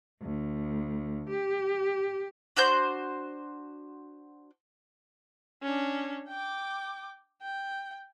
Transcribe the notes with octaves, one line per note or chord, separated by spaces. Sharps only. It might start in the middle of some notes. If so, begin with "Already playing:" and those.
D2
G4
D4 F#4 C5 G6
C#4 D4
G5 D6
G5